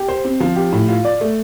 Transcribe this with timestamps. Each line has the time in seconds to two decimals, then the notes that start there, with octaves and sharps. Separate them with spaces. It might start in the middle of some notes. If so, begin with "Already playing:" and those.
Already playing: G4
0.08 C5
0.25 C4
0.40 F3
0.56 G4
0.73 A2
0.89 F4
1.05 D5
1.21 A3